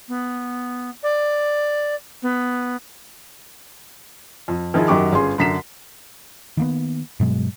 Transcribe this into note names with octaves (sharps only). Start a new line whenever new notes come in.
B3
D5
B3
F2
D#3 F3 E4 G#4
F#2 D#3 F#3 G4 C#6 D6
G1 C#4 G#4 C6
F#2 D3 A#5 B6 C7 E7
D#3 A#3 B3
G2 B2 F#3 G#3